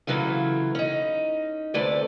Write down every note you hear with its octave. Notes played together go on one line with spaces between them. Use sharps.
C#3 E3 F#3 A3 F4
C#4 D#4
D2 C3 A3 B4 D5